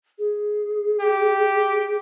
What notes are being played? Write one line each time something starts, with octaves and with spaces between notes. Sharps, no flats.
G#4
G4